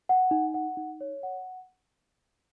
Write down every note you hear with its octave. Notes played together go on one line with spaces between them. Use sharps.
F#5
D#4
F#5
D#4
C#5
F#5